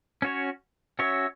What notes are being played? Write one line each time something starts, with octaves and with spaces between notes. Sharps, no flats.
C#4 F#4 C#5
C#4 F#4 C#5 E5